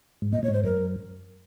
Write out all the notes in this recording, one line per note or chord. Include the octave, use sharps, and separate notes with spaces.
G#2
A#2 D#5
A#2 C#5
G#2
C5
F#2 A#4